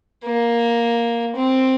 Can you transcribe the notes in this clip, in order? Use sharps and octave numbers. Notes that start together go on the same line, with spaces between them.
A#3
C4